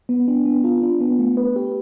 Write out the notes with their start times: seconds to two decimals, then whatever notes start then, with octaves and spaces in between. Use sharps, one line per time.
0.09 B3
0.28 D4
0.45 B3
0.64 F4
0.83 D4
1.00 B3
1.19 A3
1.37 B4
1.56 G4